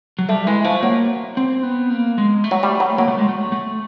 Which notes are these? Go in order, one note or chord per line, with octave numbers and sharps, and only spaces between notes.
F#3
G3 A3
E3 G#3
F3 A3
F#3 A#3
C4
B3
A#3
G#3
A3
F#3
G3
F#3
F#3 A#3
A3
G#3
A3
A3